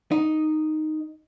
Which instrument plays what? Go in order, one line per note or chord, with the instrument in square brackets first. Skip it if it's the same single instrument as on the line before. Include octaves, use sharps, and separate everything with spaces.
[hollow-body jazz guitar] D#4